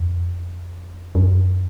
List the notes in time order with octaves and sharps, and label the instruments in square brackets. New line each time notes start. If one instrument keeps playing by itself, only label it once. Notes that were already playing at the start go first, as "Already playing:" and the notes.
Already playing: [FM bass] F2
F#2